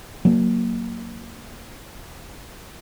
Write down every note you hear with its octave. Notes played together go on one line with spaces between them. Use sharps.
F#3 A#3